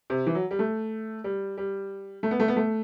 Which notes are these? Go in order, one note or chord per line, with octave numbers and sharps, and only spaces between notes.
C3
E3
F#3
G3
A3
G3
G3
A3
B3
A3
B3
A3